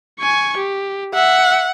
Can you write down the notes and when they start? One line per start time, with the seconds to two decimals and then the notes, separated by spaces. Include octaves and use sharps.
0.20 G#5 C#6
0.57 G4
1.14 E5 F#5